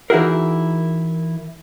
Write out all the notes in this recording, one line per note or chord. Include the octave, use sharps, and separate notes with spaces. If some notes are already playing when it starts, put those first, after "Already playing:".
E3 D#4 E4 F#4 G#4 A#4